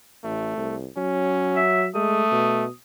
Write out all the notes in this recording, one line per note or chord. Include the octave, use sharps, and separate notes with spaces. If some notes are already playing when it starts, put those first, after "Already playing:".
A1 A3
C2
F#3 C#4
E5
G#3 A3 D#6
B2